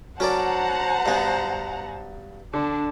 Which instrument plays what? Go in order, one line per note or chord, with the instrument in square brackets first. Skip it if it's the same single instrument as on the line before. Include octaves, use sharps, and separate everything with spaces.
[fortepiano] F#3 [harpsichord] C#4 A#4 D5 [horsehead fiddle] C5 A5 [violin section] F#5 A#5
[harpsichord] G2 B3
[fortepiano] D3 [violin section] D4 [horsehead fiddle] A5